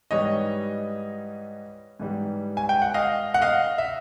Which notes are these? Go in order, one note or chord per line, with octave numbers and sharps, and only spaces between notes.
G#2 E3 G3 C#5 D#5
G#2 E3 G3
G#5
G5
F#5
D#5 F5
F#5
D#5 F5
E5